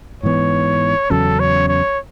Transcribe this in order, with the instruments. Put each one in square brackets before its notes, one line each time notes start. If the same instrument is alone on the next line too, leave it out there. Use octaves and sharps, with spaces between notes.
[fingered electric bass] G#2 E3 B3 [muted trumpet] C#5
[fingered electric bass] E2 C#3 F#3 C#4 [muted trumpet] A4
[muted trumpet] C#5
C#5